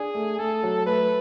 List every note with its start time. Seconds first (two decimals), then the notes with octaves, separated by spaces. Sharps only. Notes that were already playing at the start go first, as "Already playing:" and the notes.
Already playing: D4 G#4
0.15 A3
0.38 A3 A4
0.63 F#3
0.87 A3 B4